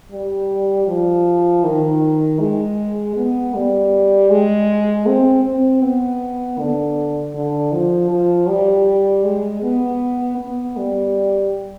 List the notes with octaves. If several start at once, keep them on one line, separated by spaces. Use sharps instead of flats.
G3
F3
D#3
G#3
B3
G3
G#3
C4
C4
B3
D3
D3
F3
F3
G3
G#3
B3
B3
G3